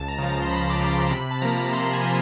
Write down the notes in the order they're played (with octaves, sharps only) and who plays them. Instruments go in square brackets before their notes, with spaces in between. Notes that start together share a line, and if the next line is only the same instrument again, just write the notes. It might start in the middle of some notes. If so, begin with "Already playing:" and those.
Already playing: [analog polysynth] C#2 A5
A#5
C#3 F3
A#5
C6
C#2 B5
D6
C#3 F3
C6
C3 B5
A5
F3 A#3 A#5
C3 C6
G#5
F3 A#3